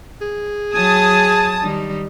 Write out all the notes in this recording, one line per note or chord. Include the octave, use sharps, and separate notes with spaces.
G#4
F#3 G#5 A5 D#6
D#3 G3 D#4